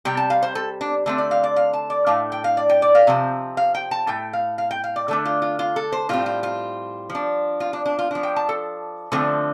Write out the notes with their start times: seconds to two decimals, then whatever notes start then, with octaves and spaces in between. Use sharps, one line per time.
0.05 C3 G3 C4 G5
0.17 A5
0.30 F5
0.43 C5
0.55 A4
0.81 D4
1.06 D3 A3 C4 D4
1.18 D5
1.31 F5
1.44 D5
1.56 F5
1.73 A5
1.90 D5
2.06 A2 A3 D4 F5
2.32 G5
2.44 F5
2.57 D5
2.69 G5
2.82 D5
2.95 F5
3.07 C3 F3 C4
3.57 F5
3.75 G5
3.91 A5
4.07 A2 A3 G5
4.33 F5
4.58 F5
4.71 G5
4.84 F5
4.96 D5
5.08 D3 A3 D4 A4
5.25 F4
5.42 F4
5.59 F4
5.76 A4
5.92 C5
6.09 A2 G3 C4 F4
6.26 F4
6.43 F4
7.10 F3
7.15 D4
7.60 F4
7.73 D4
7.86 D4
7.99 F4
8.11 F3 D4
8.23 G5
8.36 A5
8.49 A4
9.12 D3 F3 A3 C4